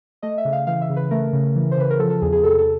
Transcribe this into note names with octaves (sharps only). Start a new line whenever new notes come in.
A3 D#5
E5
C#3
F5
E3 F5
E5
C#3
B4
A3 A#4
C#3
E3
C5
C#3 B4
A#4
F3 A4
A4
E2 G#4
G#4
C3 A4
A4